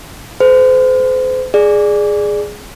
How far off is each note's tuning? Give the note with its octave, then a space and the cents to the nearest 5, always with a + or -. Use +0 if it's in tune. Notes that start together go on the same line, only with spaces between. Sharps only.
A4 -30 C5 -35
G#4 +0 D5 +10